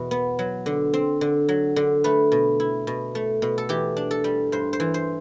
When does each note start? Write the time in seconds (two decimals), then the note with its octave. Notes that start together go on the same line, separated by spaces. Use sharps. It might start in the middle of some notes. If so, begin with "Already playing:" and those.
Already playing: E2 B2
0.11 B3
0.39 F#3
0.66 D3
0.94 C4
1.21 D3
1.49 F#3
1.76 D3
2.04 A3 B4
2.32 B2
2.60 E4
2.87 B2
3.15 A3
3.42 B2
3.58 A4
3.69 E3 G4
3.97 D4
4.11 A4
4.24 G3
4.52 G2 C5
4.73 C5
4.80 E3
4.94 C5